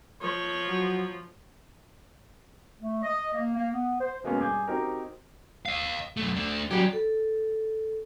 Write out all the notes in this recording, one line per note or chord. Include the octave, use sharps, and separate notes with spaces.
F3 C#5
F#3
A3
D#5
A#3
A#3
B3
C5
B2 G#3 A#3 B3 C#4 G#4
G2 G#4 D6 G6 G#6
C4 D#4 F#4 G4 A#4
D#5 F5
F#2 A3
A3 D4
F#3 G3 C#4 G4
A4